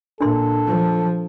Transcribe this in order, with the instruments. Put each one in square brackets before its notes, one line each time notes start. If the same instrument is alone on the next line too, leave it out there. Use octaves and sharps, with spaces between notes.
[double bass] A#2 [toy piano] D4 A#4 C6 [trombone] A4
[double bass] F3